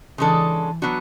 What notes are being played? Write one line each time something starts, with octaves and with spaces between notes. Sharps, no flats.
C#3 E3 G#3 D4 A4 D5
F#3 B3 D4 F#4